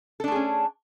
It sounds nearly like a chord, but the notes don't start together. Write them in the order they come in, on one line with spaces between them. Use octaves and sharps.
A4 D4 A3 G#4 C#4